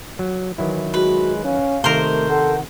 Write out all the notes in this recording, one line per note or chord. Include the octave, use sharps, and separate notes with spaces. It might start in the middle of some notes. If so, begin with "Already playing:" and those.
F#3
D#3 E3 F#3 E4
G#3 F#4 B4
C#4 F5
C3 D#3 A3 A#4 C5
A4 F#5